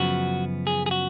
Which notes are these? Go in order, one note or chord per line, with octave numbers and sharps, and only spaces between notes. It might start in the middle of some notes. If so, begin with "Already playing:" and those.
Already playing: F#2 C#3 F3 B3 F#4
G#4
G#4
F#4